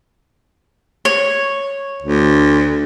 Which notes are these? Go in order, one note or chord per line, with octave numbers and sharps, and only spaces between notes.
C#5
D2